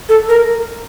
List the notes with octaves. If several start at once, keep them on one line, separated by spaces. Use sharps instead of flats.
A4
A#4